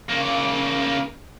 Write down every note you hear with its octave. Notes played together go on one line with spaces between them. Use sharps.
C#3 A#3